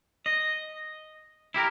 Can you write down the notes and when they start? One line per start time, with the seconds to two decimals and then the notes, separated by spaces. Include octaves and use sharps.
0.26 D#5
1.54 E4 G4 A#4